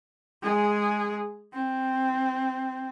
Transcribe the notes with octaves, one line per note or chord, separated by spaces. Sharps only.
G#3 G#4
C4